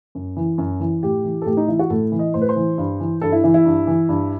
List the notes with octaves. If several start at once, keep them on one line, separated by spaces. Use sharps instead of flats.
F#2
E3
F#2
E3
A2 G4
E3
A4
A2 G4
D#4
E3 E4
F#4
A2 A4
E3
D#5
A2 C5
B4
C5
E3
G2
E3
G2 A4
E4
E3 E4
E4
G2
E3
G2